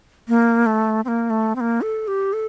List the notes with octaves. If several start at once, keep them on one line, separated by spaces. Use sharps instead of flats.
A#3
A3
C4
A#3
A3
C4
A#3
A4
G4
A4